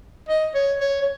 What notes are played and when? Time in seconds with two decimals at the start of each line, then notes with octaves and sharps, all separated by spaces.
0.28 D#5
0.54 C#5
0.80 C#5
1.02 C#5